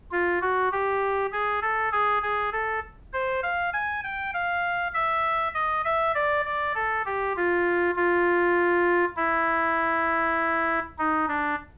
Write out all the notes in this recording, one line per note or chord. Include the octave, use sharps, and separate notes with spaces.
F4
F#4
G4
G#4
A4
G#4
G#4
A4
C5
F5
G#5
G5
F5
E5
D#5
E5
D5
D5
A4
G4
F4
F4
E4
D#4
D4